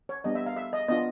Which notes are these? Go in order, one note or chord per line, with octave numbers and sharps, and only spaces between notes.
C#5
G3 B3 D4 D#5
E5
F5
E5
D#5
B3 D4 F4 D#5